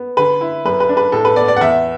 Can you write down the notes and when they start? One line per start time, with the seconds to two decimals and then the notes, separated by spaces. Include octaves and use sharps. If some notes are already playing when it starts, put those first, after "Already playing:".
Already playing: B3
0.17 D3 B4
0.41 E4
0.65 F#2 B4
0.80 B4
0.89 D4
0.97 B4
1.12 A2 A4
1.25 B4
1.36 B3 D5
1.48 D5
1.56 F#5
1.61 E2 E5